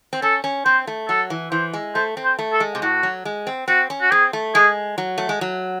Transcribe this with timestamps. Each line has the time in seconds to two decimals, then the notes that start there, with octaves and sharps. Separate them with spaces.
0.13 C4
0.22 C#4 A4
0.44 C#4
0.65 C4 C5
0.87 A3
1.08 F#3 A4
1.30 E3
1.52 E3 C5
1.73 G#3
1.95 A3 C5
2.17 C4
2.24 C5
2.39 A3
2.53 A4
2.60 G#3
2.75 C3
2.82 A2 F#4
3.03 F#3
3.25 G#3
3.47 C4
3.68 C4 F#4
3.90 C#4
4.01 F#4
4.11 C4 G#4
4.33 A3
4.55 G#3 G#4
4.98 F#3
5.18 A3
5.29 G#3
5.41 F#3